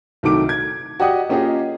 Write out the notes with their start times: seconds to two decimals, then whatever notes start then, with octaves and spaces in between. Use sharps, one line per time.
0.23 C2 D#3 F#3 A3 D6 D7
0.49 G#6
1.00 F#4 G4 D5 D#5 F#5 D#6
1.29 A#3 C#4 F4 G4 G#4 D#5